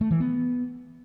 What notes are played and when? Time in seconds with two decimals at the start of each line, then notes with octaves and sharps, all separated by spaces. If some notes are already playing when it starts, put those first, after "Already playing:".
0.01 A3
0.11 E3
0.20 B3